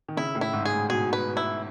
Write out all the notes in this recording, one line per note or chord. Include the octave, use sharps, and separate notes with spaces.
D#3
C#3 E4
A2
E4
G#2
G#4
A2
B2 G#4
B4
E4